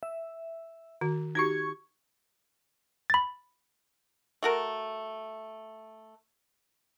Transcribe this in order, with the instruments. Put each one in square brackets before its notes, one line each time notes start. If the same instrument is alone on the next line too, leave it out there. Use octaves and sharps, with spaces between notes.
[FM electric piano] E5
[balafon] D#3 F#4
[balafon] D#4 F#4 G4 [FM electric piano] C#6 G#6
[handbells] B5 A6
[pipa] A3 F#4 A#4